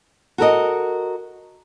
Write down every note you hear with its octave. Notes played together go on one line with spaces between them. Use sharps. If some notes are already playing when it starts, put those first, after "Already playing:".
F#4 A4 A#4 D#5